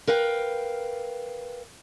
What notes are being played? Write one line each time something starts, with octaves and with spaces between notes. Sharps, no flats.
A#4 B4 F5 G5